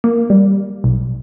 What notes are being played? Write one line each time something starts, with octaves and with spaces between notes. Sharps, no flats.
A#3
G3
B1